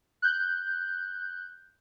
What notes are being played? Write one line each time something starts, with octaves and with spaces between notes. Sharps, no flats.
F#6 G6